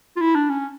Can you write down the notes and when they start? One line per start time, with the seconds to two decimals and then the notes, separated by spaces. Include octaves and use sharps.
0.16 F4
0.21 E4
0.35 D4
0.49 C#4